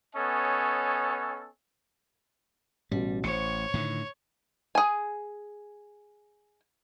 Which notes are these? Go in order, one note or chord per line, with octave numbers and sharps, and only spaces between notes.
B3 C#4 A4 C#5 D#5 G#5
A1 B2 G3
A1 C5 C#5 C#7
A2 D3 D#3
G#4 G#5